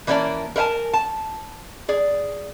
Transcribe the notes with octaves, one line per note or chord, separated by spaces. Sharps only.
E3 A#3 C#4 D#4 D5 A5
A#4 B4 E5 G#5 A5
A5
G#4 D5